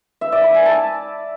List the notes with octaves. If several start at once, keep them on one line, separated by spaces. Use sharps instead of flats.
E5
D5
B5
G#5
A5